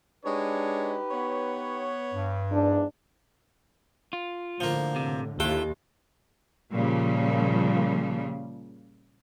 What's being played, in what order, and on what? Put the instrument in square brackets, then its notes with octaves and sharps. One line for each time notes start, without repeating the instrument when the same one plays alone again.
[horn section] G#3 D4 C#5 [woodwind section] D#4 G4 B4
[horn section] B3 C#5
[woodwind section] G2
[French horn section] E2 G#2 D4
[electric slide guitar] F4
[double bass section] A2 D3 [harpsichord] F3 A#3
[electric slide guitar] C3
[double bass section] D#2 [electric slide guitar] E4 F4 A4 [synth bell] G4 [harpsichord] G5
[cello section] A#2 C#3 F3 G3